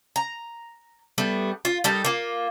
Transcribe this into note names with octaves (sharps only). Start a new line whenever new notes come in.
A#5
G3 A3 B3
F4
G3 D#4 A4 A#4
A#3 F4